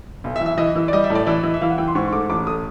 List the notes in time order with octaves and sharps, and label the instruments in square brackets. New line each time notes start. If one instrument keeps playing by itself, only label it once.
[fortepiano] B1
[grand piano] E5
[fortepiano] E3
[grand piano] E5
[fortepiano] E3 [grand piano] D#5
[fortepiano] E3
[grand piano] D5
[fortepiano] G3 [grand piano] D#5
[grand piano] E5
[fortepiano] A2
[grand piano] D5
[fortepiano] E3 [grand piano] D5
[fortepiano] E3 [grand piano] D#5
[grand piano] E5
[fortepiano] E3 [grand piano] F5
[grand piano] F#5
[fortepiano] E3 [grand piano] G5
[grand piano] C6
[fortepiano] G#2 [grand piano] C#6
[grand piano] C#6
[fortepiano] A3 [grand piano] D6
[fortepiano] A1 [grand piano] D6
[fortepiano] A3 [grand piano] D#6